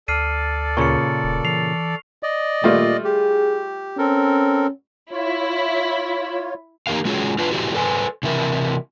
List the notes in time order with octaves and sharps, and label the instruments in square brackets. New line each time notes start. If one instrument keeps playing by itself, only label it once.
[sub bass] D2 [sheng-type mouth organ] A4 D5 [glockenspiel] F6 C7 D#7
[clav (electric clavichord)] A#2 C#3 [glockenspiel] C#6 C#7
[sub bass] D#1
[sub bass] E3 [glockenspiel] C7 F7
[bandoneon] D5 D#5
[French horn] A#2 [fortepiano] G3 A3 F4
[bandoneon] G4 [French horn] G#4
[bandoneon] C4 A4 A#4 [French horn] C#4
[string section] E4 [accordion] F4 C#5
[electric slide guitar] A#3 D#4 G4 A#4 F5
G#3 C#4 F4 F#4 G#4 C#5
D4 F4 B4
E4 F#4 G4 A4 C5 D5
A4 B4 C5 G#5
C3 E3 E4 A#4